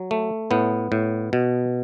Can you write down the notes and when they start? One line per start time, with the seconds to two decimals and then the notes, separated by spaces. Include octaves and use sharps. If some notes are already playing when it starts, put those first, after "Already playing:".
Already playing: F#3
0.11 A3
0.51 A2 B3
0.92 A2
1.33 B2